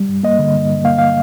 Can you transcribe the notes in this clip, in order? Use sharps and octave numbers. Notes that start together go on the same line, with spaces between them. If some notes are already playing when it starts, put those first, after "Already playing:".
Already playing: G3
G2
A#3 D#5
D3
G2
G2
A#3 F5
F5